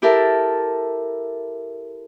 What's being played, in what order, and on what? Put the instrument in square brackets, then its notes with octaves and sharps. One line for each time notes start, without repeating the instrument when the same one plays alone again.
[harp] E4 G4 A4 A#4 E5 A5